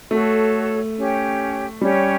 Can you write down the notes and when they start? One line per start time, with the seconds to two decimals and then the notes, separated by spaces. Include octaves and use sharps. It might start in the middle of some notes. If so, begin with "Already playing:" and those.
0.11 A3 F#4 A4 C#5
0.96 C#4 G4 C#5 G5
1.81 G3 C#4 G4 C#5 G5